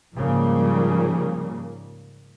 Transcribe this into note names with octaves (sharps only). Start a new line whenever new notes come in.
G#2 C#3 F3 G3 A#3